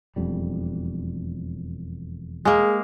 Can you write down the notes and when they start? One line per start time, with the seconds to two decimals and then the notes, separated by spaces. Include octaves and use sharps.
0.16 E1 F2 G3
2.45 G#3 A#3 G#4